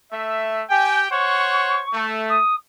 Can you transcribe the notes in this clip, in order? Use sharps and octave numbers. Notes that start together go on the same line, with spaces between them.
A3 E5
G4 G5 G#5
C5 C#5 F#5 C#6
A3
D#6